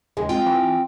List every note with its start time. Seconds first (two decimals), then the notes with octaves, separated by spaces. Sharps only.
0.17 D#2 C#3 G#3
0.29 C4 F4 G5
0.46 E3